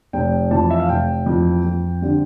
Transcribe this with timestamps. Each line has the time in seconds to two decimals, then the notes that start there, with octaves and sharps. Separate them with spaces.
0.13 F1 G5
0.51 F2 E3 A5
0.70 E5
0.80 F5
0.88 F1 G5
1.26 F2 E3
1.64 F2
2.01 D3 G3 C4